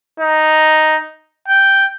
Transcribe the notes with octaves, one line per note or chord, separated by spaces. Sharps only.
D#4
G5